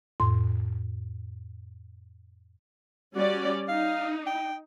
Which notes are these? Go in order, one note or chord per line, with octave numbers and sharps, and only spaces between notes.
F2 A2 C6
G3 C#4 F#4 D5
D#4 F5
G5